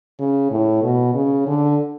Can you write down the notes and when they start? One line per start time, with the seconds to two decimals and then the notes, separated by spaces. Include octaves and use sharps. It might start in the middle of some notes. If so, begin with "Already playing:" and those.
0.20 C#3
0.51 A2
0.83 B2
1.14 C#3
1.47 D3